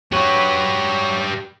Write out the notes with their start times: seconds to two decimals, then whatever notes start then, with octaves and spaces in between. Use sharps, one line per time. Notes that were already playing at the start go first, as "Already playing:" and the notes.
0.12 F#3 G4 B4 C#5